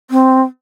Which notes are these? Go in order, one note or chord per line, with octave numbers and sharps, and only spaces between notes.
C4